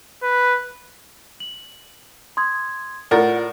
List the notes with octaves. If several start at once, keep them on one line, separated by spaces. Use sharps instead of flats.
B4
F#7
C6 D#6 G#6
A2 F4 A#4 D5 F#5 A6